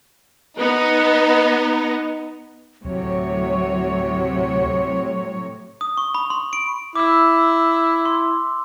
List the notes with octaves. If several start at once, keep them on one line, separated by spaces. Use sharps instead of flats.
B3 D#4
D2 A2 C3 F#3 C#5
D#6
C#6
B5
C6
D7
E4 D6 E6
C6